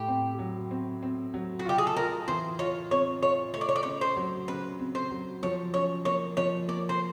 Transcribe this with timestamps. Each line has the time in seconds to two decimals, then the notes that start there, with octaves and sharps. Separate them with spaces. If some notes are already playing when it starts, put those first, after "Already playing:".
Already playing: A2 G4
0.08 C4
0.39 F#3
0.71 C4
1.03 C4
1.34 F#3
1.59 F#4
1.65 F4 G4
1.78 G#4
1.87 A4
1.96 F4 A#4
2.28 E3 C5
2.59 F4 C#5
2.91 C4 C#5
3.23 F4 C#5
3.54 A3 C#5
3.61 D5
3.69 C#5
3.76 D5
3.83 C#3 C#5
4.01 C5
4.16 F#3
4.48 C#3 B4
4.79 C4
4.95 C5
5.11 F#3
5.43 F3 C#5
5.74 C#4 C#5
6.05 A#3 C#5
6.37 F3 C#5
6.68 A#3 D5
6.89 C5